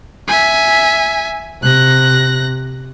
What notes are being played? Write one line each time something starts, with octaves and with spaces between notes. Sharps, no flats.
E5 G#5
C3 F#6 A#6